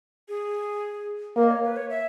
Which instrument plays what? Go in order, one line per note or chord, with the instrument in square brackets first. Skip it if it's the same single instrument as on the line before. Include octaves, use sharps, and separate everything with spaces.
[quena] G#4
[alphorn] A#3 [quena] A#4
[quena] D#5
C#5
B4
C#5
E5